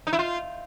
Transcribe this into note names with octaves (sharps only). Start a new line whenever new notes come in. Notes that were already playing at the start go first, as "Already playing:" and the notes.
D#4
E4
F4